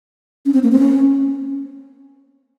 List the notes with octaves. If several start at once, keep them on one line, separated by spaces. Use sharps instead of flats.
C#4
C4
A#3
C4
C#4